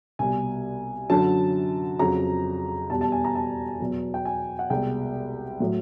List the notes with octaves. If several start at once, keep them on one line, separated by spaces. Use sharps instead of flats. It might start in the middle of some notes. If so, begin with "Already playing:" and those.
C2 B2 G3 G#5
F#2 D3 F#3 A5
F2 C#3 F#3 A#5
E2 B2 G3 A5
A5
G#5
A#5
A5
E2 B2 F#3
G5
G#5
F#5
C2 B2 G#3 G5
A2 F#3